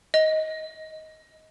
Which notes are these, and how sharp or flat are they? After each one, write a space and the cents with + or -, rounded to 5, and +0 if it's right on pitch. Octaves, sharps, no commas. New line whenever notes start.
D#5 +15